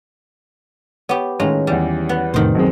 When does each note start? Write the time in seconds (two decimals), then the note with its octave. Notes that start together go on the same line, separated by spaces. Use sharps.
1.09 B3 G4 C#5
1.40 A2 D#3 G#3 C#4 F4 C#5 A#5
1.67 E2 E3 G3
2.09 B3
2.34 F2 A2 C3 D#3 C5
2.55 B1 F#2 F#3 G#3 C4